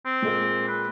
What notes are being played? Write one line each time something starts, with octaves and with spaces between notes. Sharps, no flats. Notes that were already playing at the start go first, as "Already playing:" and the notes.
C4
A#2 G#3 A#3
B4